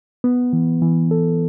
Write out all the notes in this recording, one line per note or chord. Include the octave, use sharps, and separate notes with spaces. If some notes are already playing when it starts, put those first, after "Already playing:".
B3
E3
E3
A4